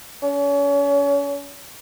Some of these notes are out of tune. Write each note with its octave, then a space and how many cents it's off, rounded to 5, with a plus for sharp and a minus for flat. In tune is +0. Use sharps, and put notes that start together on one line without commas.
C#4 +35